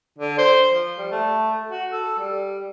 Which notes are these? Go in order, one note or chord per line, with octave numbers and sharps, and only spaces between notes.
D3
C5
F3
G3
A3
F#4
A4
G3